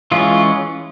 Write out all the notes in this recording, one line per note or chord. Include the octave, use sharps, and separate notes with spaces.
E3 G#3 C#4 F4